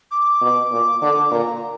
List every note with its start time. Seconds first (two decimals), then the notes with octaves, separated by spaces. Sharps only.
0.11 D6
0.41 B2
0.71 A#2
1.01 D3 D6
1.31 A#2 A#5